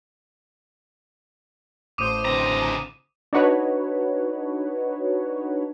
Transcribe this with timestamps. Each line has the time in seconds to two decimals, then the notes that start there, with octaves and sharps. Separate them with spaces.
1.98 A1 A2 C5 D6 D#6 D#7
2.25 C#2 D3 C4 A#5
3.33 D4 D#4 F#4 B4 C#5